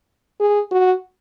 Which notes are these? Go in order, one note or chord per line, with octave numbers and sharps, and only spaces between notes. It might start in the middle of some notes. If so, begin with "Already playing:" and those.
G#4
F#4